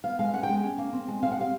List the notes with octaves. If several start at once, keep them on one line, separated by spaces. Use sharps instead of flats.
B3 F5
G#3 F5
C#4 F#5
G5
G#3
C#4
A#3
C4
G#3
C4 F5
F#5
G3 F5